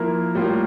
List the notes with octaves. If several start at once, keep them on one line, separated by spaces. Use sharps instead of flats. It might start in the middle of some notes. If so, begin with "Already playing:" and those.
Already playing: F3 A#3 E4 A#4
A2 G3 A#3 F4